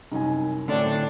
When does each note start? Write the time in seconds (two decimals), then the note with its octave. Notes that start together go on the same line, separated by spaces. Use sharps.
0.12 C2 F#2 D#4 G#5
0.68 A2 D3 F#3 A3 C4 D4